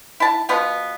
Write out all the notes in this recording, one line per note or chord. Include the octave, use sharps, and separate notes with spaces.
E4 A5
B2 F3 B3